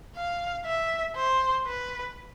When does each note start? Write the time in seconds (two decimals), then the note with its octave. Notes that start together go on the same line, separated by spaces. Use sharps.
0.16 F5
0.66 E5
1.16 C5
1.67 B4